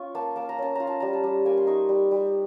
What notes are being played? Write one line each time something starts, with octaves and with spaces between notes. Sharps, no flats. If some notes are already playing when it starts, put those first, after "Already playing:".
Already playing: C#4 F4 C#6
A#3 A5
A#3 A5
A#5
C#4 A5
F4 A#5
A5
G3 A#5
A5
G3
A#3 G#5
C6
D#4 C#6
G3
G3